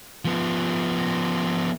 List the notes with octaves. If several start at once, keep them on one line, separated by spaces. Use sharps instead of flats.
F3 B3